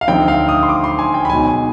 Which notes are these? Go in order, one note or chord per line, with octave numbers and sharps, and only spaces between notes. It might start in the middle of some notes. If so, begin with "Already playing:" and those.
F5
D2 D3 F3 C4 D#4 G5
F5
D#6
C6
D6
C6
G#5
G5
B5
B1 B2 G#3 G#5